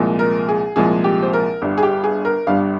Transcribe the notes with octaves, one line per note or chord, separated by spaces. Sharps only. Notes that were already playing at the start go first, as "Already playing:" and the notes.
Already playing: C2 A#2 F3 G#3
A#4
G#4
C2 A#2 F3 G#3 G#4
G4
C5
A#4
G1 G2 G3
G#4
G4
G#4
A#4
G1 G2 G3 F5